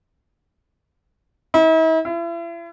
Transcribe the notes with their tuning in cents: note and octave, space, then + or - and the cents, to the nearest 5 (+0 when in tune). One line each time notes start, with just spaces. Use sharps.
E4 -45
E4 +40